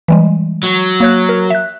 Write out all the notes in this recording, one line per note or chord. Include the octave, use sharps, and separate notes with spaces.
E3 G3 G#3
F#3
A#3 C#5 F#6
A#4
E5 F#6